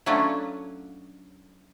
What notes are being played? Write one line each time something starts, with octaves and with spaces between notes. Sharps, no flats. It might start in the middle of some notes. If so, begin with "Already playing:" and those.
F#3 A3 C#4 D4 E4 F4